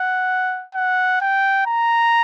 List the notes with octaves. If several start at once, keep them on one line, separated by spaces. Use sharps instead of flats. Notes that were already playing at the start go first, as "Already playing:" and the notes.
Already playing: F#5
F#5
G5
A#5